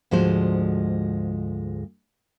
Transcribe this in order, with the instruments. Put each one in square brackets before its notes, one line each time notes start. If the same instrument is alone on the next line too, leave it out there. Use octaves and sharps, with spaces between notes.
[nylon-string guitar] D2 G#2 F3 G#3 F#4 C5